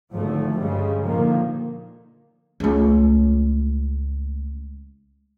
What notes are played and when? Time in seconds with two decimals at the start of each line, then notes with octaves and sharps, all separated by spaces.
0.13 G#1 D2 D3 F3 A3
0.58 D2 G2 C#3 G3 G#3
1.04 A#2 D3 D#3 F3 A#3
2.60 C#2 A3